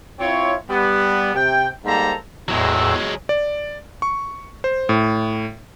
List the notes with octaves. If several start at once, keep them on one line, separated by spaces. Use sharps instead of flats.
C4 E4 F4 C#5
G3 B3
C3 G5
G#2 G3 A#3 A4 C5 A#5
E2 A2 F#3 G#3 E6
D5
C#6
C5
A2